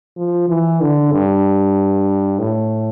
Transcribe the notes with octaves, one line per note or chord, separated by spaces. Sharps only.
F3
E3
D3
G2
A2